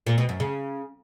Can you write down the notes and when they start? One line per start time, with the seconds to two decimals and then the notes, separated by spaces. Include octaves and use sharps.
0.07 A#2
0.18 B2
0.29 F#2
0.40 C#3